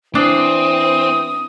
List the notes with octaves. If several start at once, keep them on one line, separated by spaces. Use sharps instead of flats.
E3 C4 D4 D#6